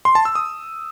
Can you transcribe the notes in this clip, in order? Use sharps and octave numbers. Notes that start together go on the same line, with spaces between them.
C6
A5
E6
D#6